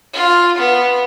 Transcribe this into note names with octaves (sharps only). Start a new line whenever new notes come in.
F4
B3